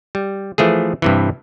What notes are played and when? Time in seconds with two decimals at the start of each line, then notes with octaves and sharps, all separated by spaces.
0.15 G3
0.58 E3 F3 A3 G#4
1.02 G2 C3 E3